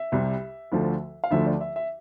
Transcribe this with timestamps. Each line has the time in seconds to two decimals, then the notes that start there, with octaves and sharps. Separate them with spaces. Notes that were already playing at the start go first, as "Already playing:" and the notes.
Already playing: E5
0.12 C2 C3 G3
0.72 D2 D3 F3 A3
1.24 F5
1.31 D2 D3 F3 A3 E5
1.46 D5
1.61 E5
1.76 E5